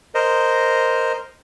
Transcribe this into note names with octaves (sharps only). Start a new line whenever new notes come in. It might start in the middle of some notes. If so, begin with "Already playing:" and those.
A#4 C5 D#5